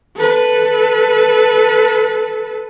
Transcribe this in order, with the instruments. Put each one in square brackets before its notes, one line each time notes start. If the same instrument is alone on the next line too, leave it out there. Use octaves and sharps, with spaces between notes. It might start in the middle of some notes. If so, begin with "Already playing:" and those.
[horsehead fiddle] A4 B4